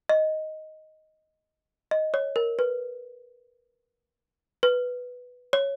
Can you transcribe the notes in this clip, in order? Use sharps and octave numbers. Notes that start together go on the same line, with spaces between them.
D#5
D#5
C#5
A#4
B4
B4
C#5